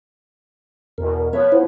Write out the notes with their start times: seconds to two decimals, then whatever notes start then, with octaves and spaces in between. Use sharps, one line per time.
0.98 E2 B2 A#4
1.33 F3 B3 B4 C#5 E5
1.52 E4 C5